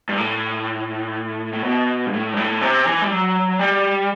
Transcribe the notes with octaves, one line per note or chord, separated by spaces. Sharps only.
G2
A2
A2
B2
G2
A2
G2
A2
C3
E3
G3
F#3
G3